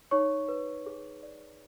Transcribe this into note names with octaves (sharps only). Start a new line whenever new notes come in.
D#4 C#5 C#6
B4
G#4
D5